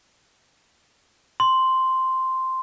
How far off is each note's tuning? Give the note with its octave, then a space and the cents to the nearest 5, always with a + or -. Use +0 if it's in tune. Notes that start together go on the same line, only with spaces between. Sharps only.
C6 -5